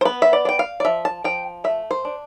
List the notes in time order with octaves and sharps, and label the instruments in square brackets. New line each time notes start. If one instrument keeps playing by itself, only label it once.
[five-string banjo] C5
B3 B4
E5
D5
D4
G5
F5
D5
F3 E5
A5
F3 G5
A3 E5
C5
D4